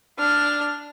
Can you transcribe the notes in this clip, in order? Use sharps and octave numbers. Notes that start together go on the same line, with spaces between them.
D4 F6